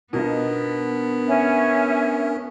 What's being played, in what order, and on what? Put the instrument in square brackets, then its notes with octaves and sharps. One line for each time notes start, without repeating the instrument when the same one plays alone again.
[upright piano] B2 D#4 F4 [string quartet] B3 [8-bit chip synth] D4 A#4
[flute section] C#4 E5